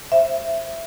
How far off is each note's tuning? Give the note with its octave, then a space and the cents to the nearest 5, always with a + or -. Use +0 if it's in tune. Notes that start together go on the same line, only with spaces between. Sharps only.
C5 +20 E5 +15